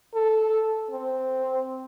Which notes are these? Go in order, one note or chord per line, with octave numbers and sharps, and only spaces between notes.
A4
C4